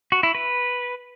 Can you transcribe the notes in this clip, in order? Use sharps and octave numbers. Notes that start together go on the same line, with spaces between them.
F#4
E4
B4